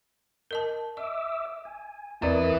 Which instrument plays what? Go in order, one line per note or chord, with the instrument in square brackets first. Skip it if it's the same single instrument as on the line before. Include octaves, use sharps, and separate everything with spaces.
[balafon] A#4 D#5 A5
[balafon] D#5 [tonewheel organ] E5 D6 E6
[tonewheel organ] G#5
[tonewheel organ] E2 A#4 D#6 [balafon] C4 D5 D#5 [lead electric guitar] E4 B4